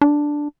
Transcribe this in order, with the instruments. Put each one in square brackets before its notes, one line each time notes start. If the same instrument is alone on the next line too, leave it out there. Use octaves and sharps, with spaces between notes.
[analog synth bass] D4